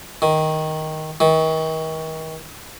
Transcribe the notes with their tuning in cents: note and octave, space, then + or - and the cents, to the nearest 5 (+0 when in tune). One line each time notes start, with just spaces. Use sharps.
D#3 +10
D#3 +40